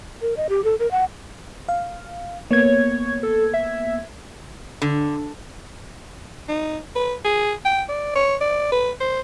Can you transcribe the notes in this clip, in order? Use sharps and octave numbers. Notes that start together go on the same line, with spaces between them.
A#4
D#5
G4
A4
A#4
F#5
F5
A#3 B3 C#5 G#6
A4
E5
D3
D#4
B4
G#4
G5
D5
C#5
D5
B4
C5